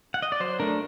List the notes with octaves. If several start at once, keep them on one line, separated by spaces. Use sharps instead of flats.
F#5
D#5
D5
F#3 C5
A3 D4 A#4